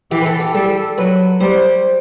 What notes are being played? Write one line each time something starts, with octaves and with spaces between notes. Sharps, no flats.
E3 G4
B4
A4
G4
G3 A4
F#3 B4
G3 C5